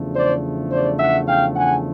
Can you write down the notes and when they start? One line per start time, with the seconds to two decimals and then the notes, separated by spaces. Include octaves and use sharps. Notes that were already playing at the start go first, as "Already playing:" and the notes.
Already playing: E2 C#3 F3 A3 D4
0.15 C5 D5
0.71 C5 D5
0.99 E5 F#5
1.27 F5 G5
1.56 F#5 G#5